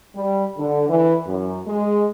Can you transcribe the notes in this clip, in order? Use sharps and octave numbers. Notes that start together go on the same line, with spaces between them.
G3
D3
E3
F#2
G#3